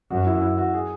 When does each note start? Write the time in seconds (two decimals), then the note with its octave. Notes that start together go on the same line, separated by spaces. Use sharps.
0.10 F#2 F#4
0.27 E4
0.42 E4
0.58 F#4
0.74 G#4